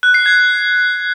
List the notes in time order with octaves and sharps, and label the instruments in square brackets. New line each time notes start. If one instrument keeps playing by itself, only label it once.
[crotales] F#6
C7
G#6